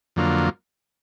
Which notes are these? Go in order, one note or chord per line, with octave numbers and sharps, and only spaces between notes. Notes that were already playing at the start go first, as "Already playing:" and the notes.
F2 D3 F#3 A#3 F4